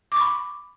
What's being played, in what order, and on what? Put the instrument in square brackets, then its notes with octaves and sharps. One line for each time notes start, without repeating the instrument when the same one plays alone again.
[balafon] D6
C#6
B5